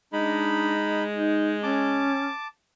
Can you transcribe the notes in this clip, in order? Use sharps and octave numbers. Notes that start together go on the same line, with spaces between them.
G#3 D4 D#4 B5
D#4
C#4 A5 D6